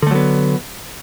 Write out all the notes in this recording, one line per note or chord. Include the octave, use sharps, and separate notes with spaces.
D3 F#3 A3 B3